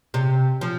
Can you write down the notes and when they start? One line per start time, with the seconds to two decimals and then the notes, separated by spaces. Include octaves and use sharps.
0.14 C3
0.61 F3